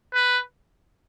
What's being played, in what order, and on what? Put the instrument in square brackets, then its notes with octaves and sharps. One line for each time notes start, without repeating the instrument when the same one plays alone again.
[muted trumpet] B4